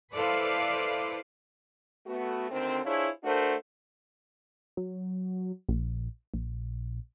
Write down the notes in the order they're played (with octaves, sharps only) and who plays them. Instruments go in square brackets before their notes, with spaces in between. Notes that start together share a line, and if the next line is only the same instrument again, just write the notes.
[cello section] E4 A4 B4 C5 D5 F5
[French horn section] A3 B3 F#4
D2 D3 D#3 C4
D4 E4 F4 G#4 C5 C#5
A3 D4 F#4 A4 A#4 C5
[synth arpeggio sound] F#3
A#1
A#1